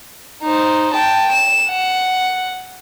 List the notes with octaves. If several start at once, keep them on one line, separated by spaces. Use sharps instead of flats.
D#4 C5
G5 A5
E7
F#5